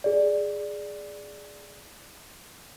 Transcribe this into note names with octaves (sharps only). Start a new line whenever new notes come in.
G#4 D5